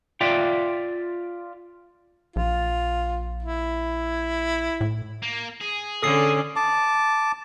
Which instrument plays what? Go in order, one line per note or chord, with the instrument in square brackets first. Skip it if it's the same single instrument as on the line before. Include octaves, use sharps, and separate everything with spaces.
[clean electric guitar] F4 D5 E5 G5
[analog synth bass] A#1 [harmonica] F4
[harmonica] E4
[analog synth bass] A2
[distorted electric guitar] A#3
G#4
[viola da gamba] D3 C#4 [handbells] A4 D#6 C7
[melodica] A5 D6